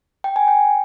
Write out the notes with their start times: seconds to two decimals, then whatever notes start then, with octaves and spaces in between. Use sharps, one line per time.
0.24 G5
0.36 G#5
0.48 G5